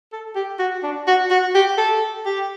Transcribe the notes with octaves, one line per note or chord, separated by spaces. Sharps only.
A4
G4
F#4
D4
F#4
F#4
G4
A4
G4